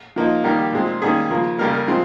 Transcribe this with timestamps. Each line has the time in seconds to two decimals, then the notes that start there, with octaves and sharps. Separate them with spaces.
0.16 F3 A#3 D#4
0.44 D#3 G3 A#3 A#4
0.58 G4
0.73 A#2 G#3 C4
1.02 D#3 G3 A#3 C#4 G#4
1.31 C#3 F3 A#3
1.58 C#3 G3 A#3 A#4
1.74 A#4
1.88 F3 G#3 C4